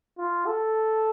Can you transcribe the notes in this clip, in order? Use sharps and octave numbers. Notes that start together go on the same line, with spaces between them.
F4
A4